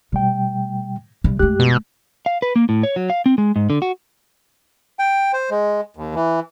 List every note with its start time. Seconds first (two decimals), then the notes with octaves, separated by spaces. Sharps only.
0.12 B2 G3 A3 G5
1.24 C3 G3
1.39 F#2 G#3 A3 G4 F#6
1.60 B2
2.26 F5
2.42 B4
2.56 A#3
2.69 A2
2.83 C#5
2.96 F#3
3.10 F5
3.26 C4
3.38 G#3
3.56 G#2
3.70 D3
3.82 F#4
4.99 G5
5.33 C5
5.50 G#3
5.97 D#2
6.15 E3